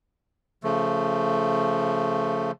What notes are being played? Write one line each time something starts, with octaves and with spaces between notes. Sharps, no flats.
C#3 F3 A3